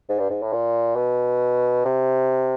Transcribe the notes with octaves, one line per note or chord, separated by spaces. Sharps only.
G#2
G2
G#2
A2
A#2
B2
C3